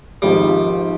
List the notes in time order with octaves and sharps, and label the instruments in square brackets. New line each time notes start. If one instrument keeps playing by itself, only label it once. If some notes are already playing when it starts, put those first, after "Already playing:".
[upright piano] G#1 G#2 F3 [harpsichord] G3